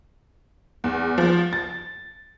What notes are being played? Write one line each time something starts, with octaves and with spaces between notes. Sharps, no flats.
E2
F3
A6